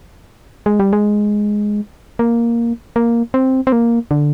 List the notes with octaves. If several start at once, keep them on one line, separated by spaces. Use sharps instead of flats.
G#3
G3
G#3
A#3
A#3
C4
C4
A#3
D3